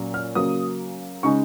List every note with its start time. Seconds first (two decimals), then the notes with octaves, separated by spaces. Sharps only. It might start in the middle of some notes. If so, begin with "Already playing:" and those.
Already playing: A#2 F#3 C#4
0.14 F6
0.35 C#3 F#3 A#3 D#6
1.23 C#3 G#3 D#4 C#6